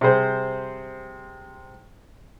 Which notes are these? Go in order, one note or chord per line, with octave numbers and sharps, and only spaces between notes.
C3 G3 G#4 C5